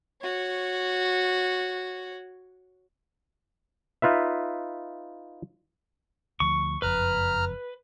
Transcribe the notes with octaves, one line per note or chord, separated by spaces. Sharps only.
F#4 C#5
D#4 F4 B4 E5
D2 F3 C#6
F#1 F2 B4 A#5 F6